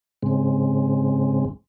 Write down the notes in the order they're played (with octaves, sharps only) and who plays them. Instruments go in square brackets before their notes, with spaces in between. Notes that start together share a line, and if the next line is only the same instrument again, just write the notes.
[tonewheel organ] G#2 C#3 G#3 C4